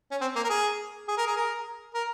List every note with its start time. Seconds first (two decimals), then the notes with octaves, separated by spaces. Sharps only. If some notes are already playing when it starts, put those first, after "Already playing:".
0.11 C#4
0.21 C4
0.36 A#3
0.44 A#4
0.49 G#4
1.08 G#4
1.18 A#4
1.27 G#4
1.36 A#4
1.94 A#4